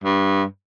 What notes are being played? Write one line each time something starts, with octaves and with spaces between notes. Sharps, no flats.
G2